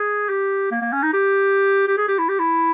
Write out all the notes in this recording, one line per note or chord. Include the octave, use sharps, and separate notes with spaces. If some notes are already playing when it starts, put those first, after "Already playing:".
Already playing: G#4
G4
A#3
A#3
C#4
D#4
G4
G4
G#4
G4
E4
G4
E4